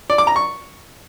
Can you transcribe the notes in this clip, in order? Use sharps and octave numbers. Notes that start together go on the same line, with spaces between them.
D5
D6
A#5
C#6